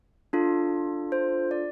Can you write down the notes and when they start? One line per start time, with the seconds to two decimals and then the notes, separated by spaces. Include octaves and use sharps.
0.33 D4 F4 A4
1.12 C5
1.51 D5